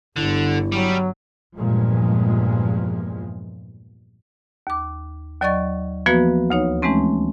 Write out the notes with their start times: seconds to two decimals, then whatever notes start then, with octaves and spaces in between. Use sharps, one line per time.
0.16 G1 D3 E4
0.72 F#3 G3
1.56 E2 G2 A#2 F3 G#3
4.67 D#2 D6
5.41 D#2 F#3 D5 D#5 C#6 A6
6.06 E3 F3 A#3 B3 F#4 B4
6.50 D2 D#4 C#5
6.82 E3 G#3 A3 C4 C#4